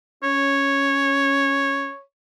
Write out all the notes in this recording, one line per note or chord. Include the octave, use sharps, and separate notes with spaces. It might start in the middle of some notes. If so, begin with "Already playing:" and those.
C#4 C#5